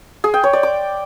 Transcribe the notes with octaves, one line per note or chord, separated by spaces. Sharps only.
G#4
G5
C#5
D5
D6